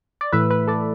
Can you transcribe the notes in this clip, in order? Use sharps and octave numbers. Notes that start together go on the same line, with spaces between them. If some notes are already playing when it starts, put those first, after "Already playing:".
D5
A2 E3 A3 B4 E5
B4
A4 D5